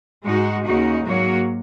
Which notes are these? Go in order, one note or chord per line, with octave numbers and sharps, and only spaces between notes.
G#2 G#3 D#4 F#4
D#2 C#3 A#3 D#4 F#4
G#2 F#3 A#3 F#4 C#5